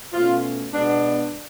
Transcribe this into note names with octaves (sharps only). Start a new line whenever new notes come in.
B2 A3 C#4 F4
B2 G#3 B3 D4